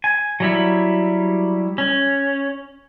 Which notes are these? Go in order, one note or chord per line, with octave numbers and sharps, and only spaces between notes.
G#5
F#3 G3 E4
C#4